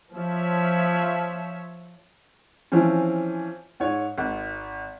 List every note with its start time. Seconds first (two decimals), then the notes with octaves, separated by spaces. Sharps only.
0.14 F3 C#5 E5
2.72 E3 F3 C4 C#4
3.80 G#2 C#5
4.18 G#1